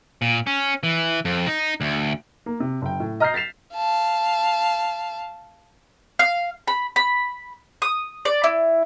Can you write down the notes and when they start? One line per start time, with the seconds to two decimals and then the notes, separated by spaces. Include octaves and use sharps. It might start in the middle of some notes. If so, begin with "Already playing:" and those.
0.22 A#2
0.47 C#4
0.83 E3
1.25 F2
1.47 D#4
1.81 D2
2.46 A#3
2.60 C3
2.82 F#1 G5
3.00 A2
3.20 D#5 A#5 F6 G6 A#6 C7
3.34 A6 B6 C7 E7 F7
3.75 F5 A5
6.19 F5
6.68 B5
6.96 B5
7.82 D#6
8.25 D5
8.44 E4